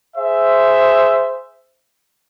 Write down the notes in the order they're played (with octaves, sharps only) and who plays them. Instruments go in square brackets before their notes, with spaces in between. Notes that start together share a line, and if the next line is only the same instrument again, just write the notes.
[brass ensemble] G#4 C5 E5